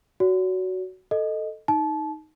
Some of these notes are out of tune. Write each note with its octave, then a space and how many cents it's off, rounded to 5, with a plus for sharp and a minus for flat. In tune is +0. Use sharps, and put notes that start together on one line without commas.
F#4 +5 C#5 +45
A4 +0 D#5 +0
D#4 +0 A5 -30